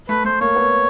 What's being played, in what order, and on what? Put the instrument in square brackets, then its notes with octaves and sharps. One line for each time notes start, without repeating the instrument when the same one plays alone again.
[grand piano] A3 [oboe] B4
[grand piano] A3 [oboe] C5
[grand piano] A#3 [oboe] C#5
[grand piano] B3